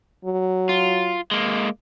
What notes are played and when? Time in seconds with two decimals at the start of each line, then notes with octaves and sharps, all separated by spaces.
0.25 F#3
0.69 F4
1.31 G#3 A#3